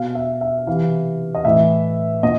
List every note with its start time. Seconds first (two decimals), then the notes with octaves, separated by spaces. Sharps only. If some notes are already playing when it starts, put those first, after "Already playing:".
Already playing: B2 F5
0.15 E5
0.41 E5
0.67 C3 E3 F5
1.35 D#5
1.45 A2 E3 E5
2.23 A#2 D#5